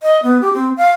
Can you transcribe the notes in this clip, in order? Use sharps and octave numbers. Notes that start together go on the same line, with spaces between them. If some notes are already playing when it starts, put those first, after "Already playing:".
D#5
B3
G4
C4
F5